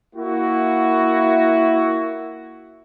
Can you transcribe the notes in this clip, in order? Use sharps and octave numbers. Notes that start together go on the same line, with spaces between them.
A#3 E4 F#4